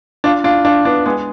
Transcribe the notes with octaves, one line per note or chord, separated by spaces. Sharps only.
D4 F4
D4 F4
D4 F4
B3 D4
G#3 B3